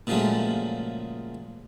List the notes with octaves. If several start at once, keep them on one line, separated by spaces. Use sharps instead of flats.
A#2 C#3 F3 F#3 G#3 A3